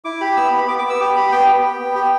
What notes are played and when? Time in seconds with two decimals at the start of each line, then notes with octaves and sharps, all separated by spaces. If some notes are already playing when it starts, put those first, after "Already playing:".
0.05 E4 D6
0.21 G4 B5
0.37 B3 E6
0.47 B5
0.53 B3
0.58 B5
0.68 B3 D6
0.79 D6
0.84 B3
0.89 E6
1.00 G4 D6
1.16 G4 B5
1.32 B3 G5
1.48 B3
1.63 B3
1.80 B3
1.95 G4